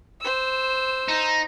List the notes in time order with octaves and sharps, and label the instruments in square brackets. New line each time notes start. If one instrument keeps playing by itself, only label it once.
[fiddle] C5 E6
[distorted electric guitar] D#4